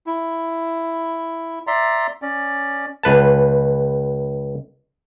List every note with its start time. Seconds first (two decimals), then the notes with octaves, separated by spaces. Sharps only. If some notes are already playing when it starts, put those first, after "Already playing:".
0.07 E4
1.67 D5 E5 A#5 C6
2.22 C#4 D5
3.03 C#2 B4 A5